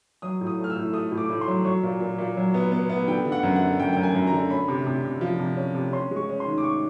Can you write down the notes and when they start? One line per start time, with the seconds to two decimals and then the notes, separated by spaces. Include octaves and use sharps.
0.22 F#3 D#6
0.41 A2
0.47 D#6
0.58 A3
0.64 F6
0.70 E6
0.76 A2
0.93 A3 D#6
1.12 A2
1.18 D6
1.29 A2
1.41 C6
1.48 F#3
1.65 F#3 C#6
1.83 A#2
2.00 A#2
2.18 A#2
2.37 F#3
2.54 B3
2.72 B3
2.89 B3
3.08 D3 G5
3.25 D3
3.32 F#5
3.43 F#2
3.56 F#5
3.61 D3
3.80 F#2 G5
3.93 F#2 G5
4.03 G#5
4.14 F#2
4.27 A#5
4.33 D3
4.50 C#4 B5
4.68 C3
4.87 C3
5.04 C3
5.21 F3
5.39 C3
5.57 C#4
5.75 C3
5.93 C#4 C6
6.11 G#3
6.16 C#6
6.29 C#4
6.40 C6
6.46 D#3
6.58 D6
6.64 C#6